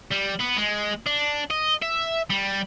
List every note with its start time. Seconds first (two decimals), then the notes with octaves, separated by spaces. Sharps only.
0.11 G3
0.40 B3
0.57 G#3
1.06 D4
1.51 D#5
1.82 E5
2.30 G3